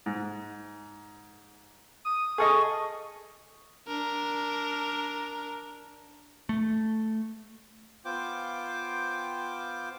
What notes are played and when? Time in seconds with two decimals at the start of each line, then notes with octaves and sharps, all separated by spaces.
0.06 G#2
2.05 D#6
2.38 G#4 A4 D#5 C#6
3.88 D4 A#4
6.49 A3
8.05 B3 F4 C5 G5 D6